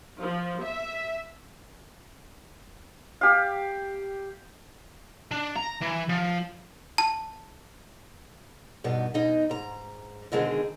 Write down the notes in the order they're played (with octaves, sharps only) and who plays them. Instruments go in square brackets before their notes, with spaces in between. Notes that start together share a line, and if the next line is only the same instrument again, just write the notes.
[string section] F3
E5
[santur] G4 F5
[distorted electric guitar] D4
A#5
E3
F3
[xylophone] A5
[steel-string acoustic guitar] G2 B2 B3 D#4
B2 D#4 D#5
G#2 A#5
B2 D3 D#3 G#3 C4 G#4